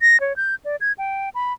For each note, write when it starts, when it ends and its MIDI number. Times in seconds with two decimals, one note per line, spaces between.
0.01 0.20 94
0.20 0.36 73
0.36 0.55 91
0.65 0.76 74
0.81 0.92 92
0.98 1.29 79
1.35 1.53 83